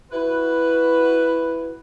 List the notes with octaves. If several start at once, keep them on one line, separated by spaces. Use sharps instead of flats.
E4 F#4 B4